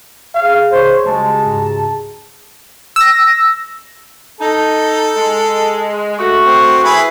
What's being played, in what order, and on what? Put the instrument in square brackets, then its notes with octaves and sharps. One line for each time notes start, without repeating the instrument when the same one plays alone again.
[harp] G#4 C#5 [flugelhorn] F5
[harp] C#2 [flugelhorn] C5 [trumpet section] C#5
[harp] G3 F#4 [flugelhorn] G#3 [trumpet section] A5
[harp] G#2 A#5
[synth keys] E6 A#6
[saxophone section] D#4 [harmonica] A4
[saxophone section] G#3
A3 F#4
[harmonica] C4
E4 G#4 B4